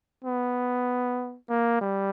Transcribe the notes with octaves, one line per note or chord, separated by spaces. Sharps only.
B3
A#3
G3